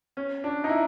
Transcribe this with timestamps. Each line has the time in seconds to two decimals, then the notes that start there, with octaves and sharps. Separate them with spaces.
0.17 C#4
0.44 D4
0.64 D#4
0.69 E4